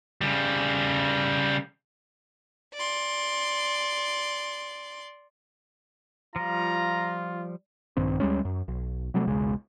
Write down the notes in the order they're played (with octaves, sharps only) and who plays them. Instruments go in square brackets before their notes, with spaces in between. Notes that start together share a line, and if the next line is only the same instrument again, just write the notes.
[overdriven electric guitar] C#3 G3
[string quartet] D5 C6
[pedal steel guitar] F3 G3 [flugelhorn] F4 [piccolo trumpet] A#5
[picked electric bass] A#1 G2 D#3 C4
D2 G3 G#3 C#4
F#2
B1
C3 F#3 G3 A3
E1 B1 C#3 G#3